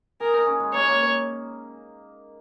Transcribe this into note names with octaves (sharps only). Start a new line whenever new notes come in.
G#4 A#4
D#4
C#4
G#3
A#3 C#5
G#3
A#3